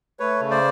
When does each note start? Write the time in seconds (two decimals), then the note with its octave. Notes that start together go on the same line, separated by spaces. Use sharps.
0.20 A3 B4 C#5
0.41 C#3
0.50 C5 D5